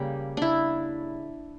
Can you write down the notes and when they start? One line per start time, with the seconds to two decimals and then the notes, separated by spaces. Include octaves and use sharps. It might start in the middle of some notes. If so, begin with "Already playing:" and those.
Already playing: C#3 G3 A#3 G4
0.37 D4 E4